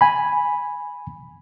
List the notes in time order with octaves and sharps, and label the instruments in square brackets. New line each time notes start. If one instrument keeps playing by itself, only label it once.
[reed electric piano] G#5 B5